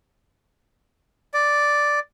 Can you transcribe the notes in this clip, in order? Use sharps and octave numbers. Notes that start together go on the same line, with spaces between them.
D5